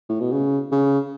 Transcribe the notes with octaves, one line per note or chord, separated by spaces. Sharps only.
A2
B2
C#3
C#3